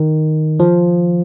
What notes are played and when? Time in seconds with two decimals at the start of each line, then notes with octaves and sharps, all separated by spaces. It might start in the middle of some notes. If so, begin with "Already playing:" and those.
Already playing: D#3
0.60 F3